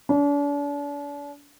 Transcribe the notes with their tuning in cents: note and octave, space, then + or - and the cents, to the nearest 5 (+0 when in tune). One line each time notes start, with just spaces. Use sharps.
D4 -40